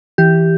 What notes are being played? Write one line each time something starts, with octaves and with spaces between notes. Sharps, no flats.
E3 G4